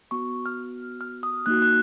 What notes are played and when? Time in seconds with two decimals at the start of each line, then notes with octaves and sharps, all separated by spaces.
0.11 B3 F#4 C#6
0.46 F6
1.01 F6
1.23 D#6
1.46 A#3 D#4 F#4 F#6
1.62 F#6